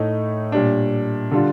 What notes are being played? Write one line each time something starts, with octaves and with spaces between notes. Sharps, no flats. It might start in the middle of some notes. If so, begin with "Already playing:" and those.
Already playing: A2 A3 D#4
A#2 G3 D4
D3 G3 D4 F4